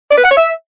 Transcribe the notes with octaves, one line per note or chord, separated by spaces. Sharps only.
D5
B4
F#5
C#5
E5